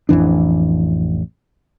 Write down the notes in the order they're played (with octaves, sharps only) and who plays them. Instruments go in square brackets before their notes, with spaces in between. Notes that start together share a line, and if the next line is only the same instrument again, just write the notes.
[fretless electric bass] A1 F2 E3 D4